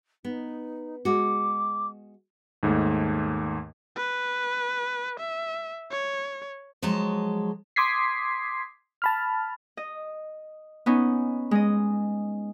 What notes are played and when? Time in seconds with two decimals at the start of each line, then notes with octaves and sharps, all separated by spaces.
0.25 B3 D#4
1.05 G#3 F#4 D6
2.63 D#2 G#2 A3
3.97 B4
5.20 E5
5.91 C#5
6.82 F3 F#3 G#3 A5
7.76 C6 D6 D#6 G#6 B6 C7
9.02 A5 B5 F6
9.77 D#5
10.86 B3 C#4 D#4
11.51 G#3 D#5